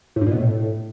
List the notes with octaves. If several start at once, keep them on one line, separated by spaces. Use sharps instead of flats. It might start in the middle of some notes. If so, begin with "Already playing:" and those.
A2
G2
A#2
B2
A2